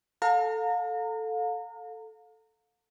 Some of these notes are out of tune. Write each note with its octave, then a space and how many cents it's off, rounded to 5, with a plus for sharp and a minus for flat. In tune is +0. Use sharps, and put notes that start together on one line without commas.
A4 +0 F5 +35 A#5 -30